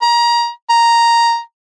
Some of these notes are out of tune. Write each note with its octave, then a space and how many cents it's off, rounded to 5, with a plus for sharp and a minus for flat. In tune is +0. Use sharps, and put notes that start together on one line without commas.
A#5 +25
A#5 +0